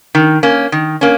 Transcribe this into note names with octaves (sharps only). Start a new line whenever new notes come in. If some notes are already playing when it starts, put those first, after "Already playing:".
D#3
A#3 C#4
D#3
A#3 C#4